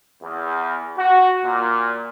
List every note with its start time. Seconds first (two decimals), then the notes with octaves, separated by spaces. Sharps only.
0.22 E2
0.96 F#4
1.44 A#2